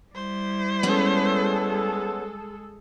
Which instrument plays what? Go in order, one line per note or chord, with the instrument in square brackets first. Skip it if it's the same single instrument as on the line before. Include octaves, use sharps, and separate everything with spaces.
[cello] G3 E4 [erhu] C5
[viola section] G#3 G#4 A4 [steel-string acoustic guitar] B3 C#4